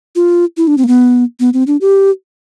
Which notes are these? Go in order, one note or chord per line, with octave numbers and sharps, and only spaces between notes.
F4
E4
D4
C4
A#3
B3
B3
C4
D4
G4